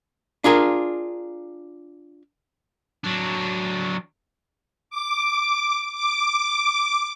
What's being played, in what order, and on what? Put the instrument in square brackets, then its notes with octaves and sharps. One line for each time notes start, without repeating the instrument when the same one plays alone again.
[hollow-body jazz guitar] D4 F4 G#4 A#4
[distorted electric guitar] F#3 D4
[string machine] D6
D6